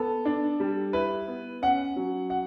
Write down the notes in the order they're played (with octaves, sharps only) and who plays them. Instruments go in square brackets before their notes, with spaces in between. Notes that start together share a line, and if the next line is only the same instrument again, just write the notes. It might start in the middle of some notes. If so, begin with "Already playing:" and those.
Already playing: [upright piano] B3 [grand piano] A4
[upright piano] D4
G3
[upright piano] E4 [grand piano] B4
[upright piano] B3
[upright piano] C#4 [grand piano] F#5
[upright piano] F#3
[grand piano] F#5